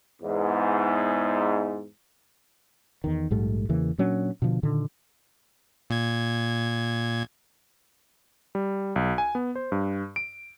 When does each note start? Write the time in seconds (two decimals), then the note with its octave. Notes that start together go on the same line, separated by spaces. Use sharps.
0.22 E2 G#2
3.04 E2 D#3
3.30 A#1 G#2 G3 A3
3.69 E2 C#3 E3 A#3
3.98 A#2 F#3 C#4 D4
4.42 B2 D3 F3
4.63 A#2 D3 D#3
5.90 A#2 G#6
8.55 G3
8.96 B1
9.18 G#5
9.35 B3
9.56 C5
9.72 G2
10.16 D7